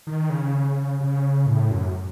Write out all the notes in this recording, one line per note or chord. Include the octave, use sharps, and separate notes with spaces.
D#3
C#3
C#3
A2
F#2